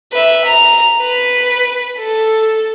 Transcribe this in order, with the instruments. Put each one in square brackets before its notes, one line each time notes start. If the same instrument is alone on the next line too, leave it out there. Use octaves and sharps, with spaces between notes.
[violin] B4 E5
A#5 F7
B4
A4